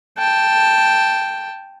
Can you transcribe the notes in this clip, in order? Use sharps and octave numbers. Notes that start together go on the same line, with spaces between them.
G5 A5